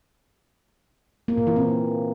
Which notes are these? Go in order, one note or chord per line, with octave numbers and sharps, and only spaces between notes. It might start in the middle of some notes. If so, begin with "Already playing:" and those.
A#3
A#2
E3
C4